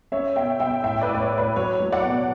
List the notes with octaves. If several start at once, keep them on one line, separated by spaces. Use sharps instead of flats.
C#4 C#5 E5
B2 E5 G5
B2 E5 G5
A2 E5 G5
B4 D5
A2
D5
C#5
A2
B4
F#3 C#5
F#3
D5 F#5
B2